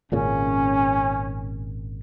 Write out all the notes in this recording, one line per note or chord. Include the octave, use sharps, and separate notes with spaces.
G#1 A#2 C#3 C#4